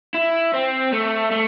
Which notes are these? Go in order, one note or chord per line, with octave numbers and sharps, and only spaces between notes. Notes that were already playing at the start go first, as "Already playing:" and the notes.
E4
C4
A3
A3